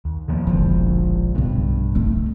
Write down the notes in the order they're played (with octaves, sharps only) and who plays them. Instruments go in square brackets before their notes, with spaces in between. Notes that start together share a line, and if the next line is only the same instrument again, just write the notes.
[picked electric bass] D#2
D#3 F3 A#3
[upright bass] E1 D3 [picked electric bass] A#1 F3
[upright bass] B1 B2 [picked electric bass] G2
[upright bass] A3 D#4